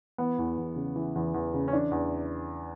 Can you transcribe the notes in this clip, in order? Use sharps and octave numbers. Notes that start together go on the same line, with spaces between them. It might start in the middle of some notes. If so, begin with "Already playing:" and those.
E3 B3
E2
E2
C#3
E3
E2
E2
C#3
C#4
E3 D4
E2